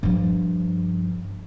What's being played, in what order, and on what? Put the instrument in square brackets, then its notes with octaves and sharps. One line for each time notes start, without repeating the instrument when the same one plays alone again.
[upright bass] G2 F3